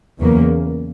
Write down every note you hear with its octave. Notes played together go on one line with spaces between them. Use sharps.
E2 C#3 F#3 A#3